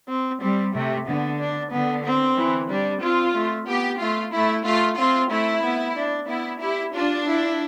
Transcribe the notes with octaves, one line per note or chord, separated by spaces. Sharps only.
C4
G3 C4
C3 A3
D3 B3
D4
D3 B3
C4
E3
G3 D4
C4 F4
A3
B3 G4
A3 F4
A3 E4
A3 F4
C4 F4
A3 E4
B3
D4
B3 E4
E4 G4
D4 F4
E4